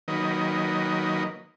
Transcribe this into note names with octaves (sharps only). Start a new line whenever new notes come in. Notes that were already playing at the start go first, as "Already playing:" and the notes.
D#3 F#3 A#3 B4 D#5